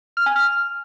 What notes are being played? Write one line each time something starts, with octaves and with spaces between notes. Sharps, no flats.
F6
G#5
F6